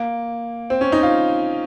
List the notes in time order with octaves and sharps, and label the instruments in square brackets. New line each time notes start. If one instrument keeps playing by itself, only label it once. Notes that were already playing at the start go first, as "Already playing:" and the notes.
Already playing: [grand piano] A#3
C4
C#4
D#4
F4